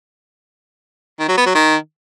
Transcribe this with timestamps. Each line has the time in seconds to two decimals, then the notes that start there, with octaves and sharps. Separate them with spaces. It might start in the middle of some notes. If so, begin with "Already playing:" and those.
1.20 D#3
1.28 F#3
1.37 B3
1.46 F#3
1.55 D#3